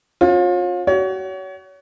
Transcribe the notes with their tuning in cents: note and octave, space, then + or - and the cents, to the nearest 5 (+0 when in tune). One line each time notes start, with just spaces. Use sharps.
C#4 -35 F4 +35
F#4 +30 C#5 +30